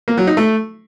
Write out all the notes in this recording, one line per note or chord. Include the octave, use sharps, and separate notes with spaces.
A#3
F#3
D#4
A3